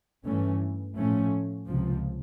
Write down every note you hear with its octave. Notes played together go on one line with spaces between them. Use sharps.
G2 E3 A3 C#4
A2 F3 A3 C#4
C#2 C3 F3